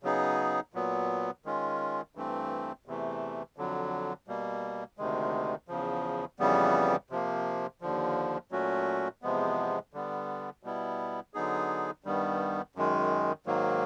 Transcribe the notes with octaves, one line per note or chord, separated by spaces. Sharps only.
C#3 F#3 B3 D#4 G#4
A#2 F#3 B3
D#3 G#3 C#4 F4
G2 E3 A3 C4
E2 C3 E3 A3
F2 D3 F#3
B2 G3 A#3
D2 C3 D#3 G#3
E2 C#3 F3
F2 C#3 E3 G3 B3
C3 F3 A#3
D#2 D3 F3
A#2 F#3 A3 C#4 F#4
E2 C3 F3 G#3 B3
D3 G3 B3
B2 G3 B3 E4
D3 F#3 B3 D#4 G#4
G2 D#3 G3 B3
F#2 D#3 G#3
G#2 D#3 F#3 A#3